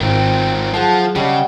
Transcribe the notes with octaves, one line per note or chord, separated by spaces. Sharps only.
G#1 D#3 C4 F4 A#4 G5
F3 F#3 G#4 A4 F#5 A5
C#3 G3 B3 D#5 F#5